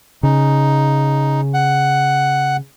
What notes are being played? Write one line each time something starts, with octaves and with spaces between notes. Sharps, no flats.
C#3 D#4
F#5